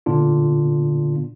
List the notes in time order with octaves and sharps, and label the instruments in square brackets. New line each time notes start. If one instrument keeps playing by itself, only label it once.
[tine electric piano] A#2 D3 B3 D4 F4